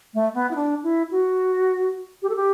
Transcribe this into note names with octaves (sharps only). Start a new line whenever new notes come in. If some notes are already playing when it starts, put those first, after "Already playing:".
A3
B3
E4
D4
E4
F#4
G4
A4
G4